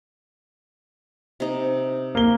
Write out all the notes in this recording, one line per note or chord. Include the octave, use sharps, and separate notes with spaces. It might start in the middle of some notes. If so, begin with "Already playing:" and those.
C3 D#4
A#3 G7